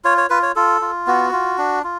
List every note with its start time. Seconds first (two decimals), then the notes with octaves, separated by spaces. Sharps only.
0.04 F4 C#5
0.18 C#5
0.30 F4 B4
0.43 C#5
0.56 F4 A4
0.81 F4
1.07 B3 F#4
1.33 F4
1.58 D4
1.84 F4